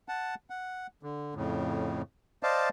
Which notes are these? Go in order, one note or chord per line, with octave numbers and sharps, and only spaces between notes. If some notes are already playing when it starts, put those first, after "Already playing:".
F#5 A5
F#5
D3
F2 A2 C#3
C5 D5 D#5 F5 A5